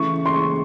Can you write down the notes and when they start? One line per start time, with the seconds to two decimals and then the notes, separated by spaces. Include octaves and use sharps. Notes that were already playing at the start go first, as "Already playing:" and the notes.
Already playing: C#3 E3 A3 C#6
0.26 C6
0.34 C#6